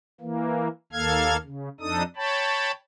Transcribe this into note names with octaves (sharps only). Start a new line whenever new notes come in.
E3 A#3
D#2 A#3 A4 F5 F6 G#6
C#3
F2 D4 D#4 A4 D#6
C#5 G5 A5 B5